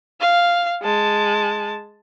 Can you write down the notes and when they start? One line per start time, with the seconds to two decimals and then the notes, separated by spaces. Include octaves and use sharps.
0.21 F5
0.82 G#3 A5